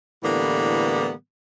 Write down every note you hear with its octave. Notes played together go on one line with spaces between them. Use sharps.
A2 D3 E3 G3 A#3 B3